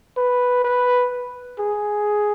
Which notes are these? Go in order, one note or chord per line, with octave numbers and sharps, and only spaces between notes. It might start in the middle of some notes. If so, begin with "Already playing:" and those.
B4
B4
G#4